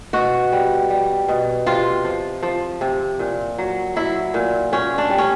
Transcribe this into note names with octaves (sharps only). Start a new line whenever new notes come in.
B2 F#4
G3
G3
B2
C3 F4
F3
F3
C3
A#2
F#3
F#3 E4
A#2
A#2 C#4
D4
G3
C#4